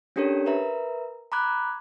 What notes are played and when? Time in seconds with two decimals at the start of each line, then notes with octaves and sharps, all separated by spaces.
0.16 C#4 D4 G4 A4 A#4 C#5
0.46 A#4 B4 E5 A#5
1.32 A#5 B5 D6 F#6 G#6